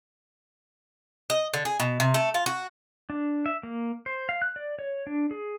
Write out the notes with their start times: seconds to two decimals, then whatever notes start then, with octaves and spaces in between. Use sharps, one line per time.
1.30 D#5
1.54 D3
1.65 G#4
1.80 B2
2.00 C3
2.14 A3
2.34 F4
2.46 F#4
3.10 D4
3.46 E5
3.63 A#3
4.06 C5
4.29 F5
4.42 F#6
4.56 D5
4.79 C#5
5.07 D4
5.31 G#4